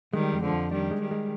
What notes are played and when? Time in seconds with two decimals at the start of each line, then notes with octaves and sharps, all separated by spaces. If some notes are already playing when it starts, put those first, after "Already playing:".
0.13 D#3 G3 G#3
0.33 F2
0.43 D3 F3
0.52 F2
0.71 D#3 G3 D4
0.91 G#3
1.00 D#3 G3
1.11 G#3